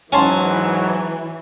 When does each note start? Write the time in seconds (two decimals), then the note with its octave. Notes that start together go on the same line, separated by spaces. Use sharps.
0.12 G#2 E3 F#3 C#4 G#5 A5 C6